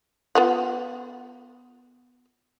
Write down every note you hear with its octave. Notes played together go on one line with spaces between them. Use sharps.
B3 F4 F#5